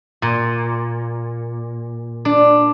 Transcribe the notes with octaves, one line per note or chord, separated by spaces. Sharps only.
A#2
D4